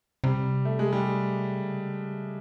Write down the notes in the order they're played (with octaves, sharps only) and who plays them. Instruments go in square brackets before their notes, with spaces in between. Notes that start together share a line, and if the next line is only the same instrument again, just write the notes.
[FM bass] C3 [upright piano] G3
[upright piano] A3
G#3
G3
[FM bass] C#3